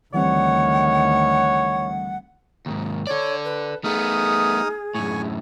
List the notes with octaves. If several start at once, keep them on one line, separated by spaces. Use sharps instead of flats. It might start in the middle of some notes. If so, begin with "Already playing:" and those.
D2 D#3 E3 G3 C4 C#5 F#5
D#2 G#2
A4 C#5 D5
B4
A3 B3 D#4 G#4 D#6 F6
F#2 A2 G#5 C#6